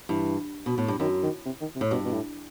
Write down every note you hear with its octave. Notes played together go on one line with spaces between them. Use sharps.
G2 E3
B2
A2
G2
F#2 D#3
D#3
C3
D#3
C3
A2
G2 B2
B2
A2